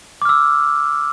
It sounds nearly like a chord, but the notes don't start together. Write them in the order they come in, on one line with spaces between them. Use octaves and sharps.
D6 F6 E6